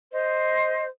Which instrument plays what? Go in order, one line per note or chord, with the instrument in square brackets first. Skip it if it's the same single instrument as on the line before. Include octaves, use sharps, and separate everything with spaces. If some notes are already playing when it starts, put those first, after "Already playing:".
[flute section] C5 D#5